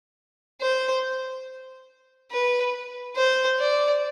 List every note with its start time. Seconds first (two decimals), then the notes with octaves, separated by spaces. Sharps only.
0.61 C5
2.31 B4
3.16 C5
3.59 D5